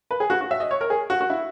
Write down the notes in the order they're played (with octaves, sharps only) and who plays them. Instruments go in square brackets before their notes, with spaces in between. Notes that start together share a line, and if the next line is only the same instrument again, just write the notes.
[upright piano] B4
G#4
F#4
F#4
E5
D#5
C#5
A#4
G#4
F#4
F#4
E4